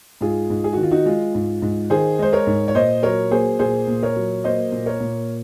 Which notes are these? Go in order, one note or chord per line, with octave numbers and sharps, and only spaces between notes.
G#2 F4 G#4
G#2
G#4
D#3 F#4
F4
D#4 F#4
G#3 F4
G#2
G#2
D#3 G#4 C5
G#3 C5
A#4 C#5
G#2
C#5
A#2 C5 D#5
F#3 A#4 C#5
A#3 G#4 C5
A#2 G#4 C5
A#2
A#4 C#5
F#3
A#3 C5 D#5
A#2
A#4 C#5
A#2